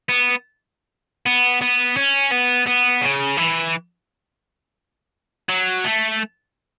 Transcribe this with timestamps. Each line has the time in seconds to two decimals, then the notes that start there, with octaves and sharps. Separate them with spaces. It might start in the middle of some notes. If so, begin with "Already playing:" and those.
0.09 B3
1.26 B3
1.62 B3
1.97 C#4
2.32 B3
2.67 B3
3.02 C#3
3.37 E3
5.49 F#3
5.84 A3